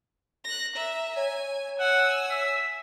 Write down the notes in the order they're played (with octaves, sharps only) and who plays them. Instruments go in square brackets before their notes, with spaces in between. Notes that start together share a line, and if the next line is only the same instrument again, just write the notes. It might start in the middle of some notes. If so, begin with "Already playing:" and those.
[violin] F#6 A#6
E5 A#5
[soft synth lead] C#5 [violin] G#5
[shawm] F#5 [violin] G#5 E6
[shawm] E5